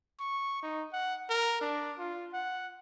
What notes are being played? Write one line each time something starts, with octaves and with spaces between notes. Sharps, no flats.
C#6
D#4
F#5
A#4
D4
F4
F#5